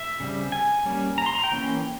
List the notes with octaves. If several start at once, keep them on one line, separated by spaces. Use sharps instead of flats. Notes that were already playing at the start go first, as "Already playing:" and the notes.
Already playing: E5
C#3 G3 C4
G#5
G3 A#3 C#4
A#5
C6
A#5
G5
E3 A#3 C#4